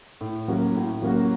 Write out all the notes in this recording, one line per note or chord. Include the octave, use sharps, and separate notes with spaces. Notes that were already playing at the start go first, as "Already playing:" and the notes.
A2
F#3 A#3 C#4 F#4
A2
F#3 A#3 C#4 F#4